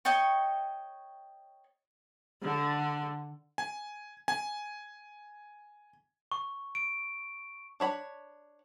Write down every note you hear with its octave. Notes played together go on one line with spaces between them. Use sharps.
C#5 D#5 G5 C#6
D3
G#5
G#5
C#6
D7
D4 C#5 B5